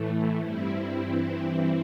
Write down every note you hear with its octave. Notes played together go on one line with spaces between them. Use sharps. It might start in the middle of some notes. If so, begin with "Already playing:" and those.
Already playing: A2 E3 A3
G2 G3 C4 E4
G2 E3 C4 E4